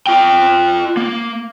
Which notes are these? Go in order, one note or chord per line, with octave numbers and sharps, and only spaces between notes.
F4 G5
A#3